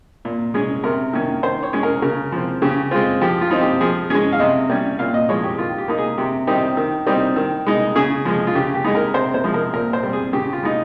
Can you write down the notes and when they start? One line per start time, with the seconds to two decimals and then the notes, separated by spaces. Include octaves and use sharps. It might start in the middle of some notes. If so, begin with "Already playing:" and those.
0.25 A#2
0.54 G#3 C#4 G#4
0.84 C3 A#4
1.13 D#3 A#3 C#4
1.43 D#3 C5
1.63 C#5
1.73 G#3 C#4
1.83 A#4
2.02 C#3 A#4
2.32 F3 C4
2.62 C#3 G4
2.91 G#3 C4 F4
3.21 F3 G4
3.41 F4
3.51 C4 D#4
3.61 G4
3.80 F3 G#4
4.10 G#3 C#4 G#4
4.32 F5
4.40 C3 D#5
4.70 G3 C#4
4.99 A#2 F5
5.14 D#5
5.29 F3 G#3 C#5
5.43 G4
5.58 D#3 F4
5.78 G4
5.88 A#3 D#4
5.98 G#4
6.18 C3 G4
6.47 D#3 G3 C4 D#4 G4
6.77 D#3
7.07 G3 C4 D#4
7.36 D#3
7.66 G#3 D#4
7.95 C#3 G#4
8.25 F3 G#3
8.47 F4
8.55 C#3 G4
8.75 G4
8.84 G#3 D#4
8.95 A#4
9.14 C3 C5
9.34 C5
9.44 F3 G#3
9.54 A#4
9.73 A#2 A#4
9.93 C5
10.03 G3 C4
10.13 G#4
10.33 C#3 G4
10.53 F4
10.63 G#3 D#4